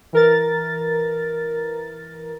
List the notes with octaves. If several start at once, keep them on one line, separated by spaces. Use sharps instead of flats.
E3 A#4 A6